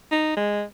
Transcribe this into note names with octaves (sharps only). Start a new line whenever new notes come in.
D#4
G#3